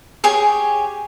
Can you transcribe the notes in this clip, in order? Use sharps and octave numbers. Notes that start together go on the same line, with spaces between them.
G4 G#4 C#5 G#5